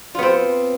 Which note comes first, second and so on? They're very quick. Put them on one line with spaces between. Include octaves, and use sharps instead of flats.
F4 B3 C4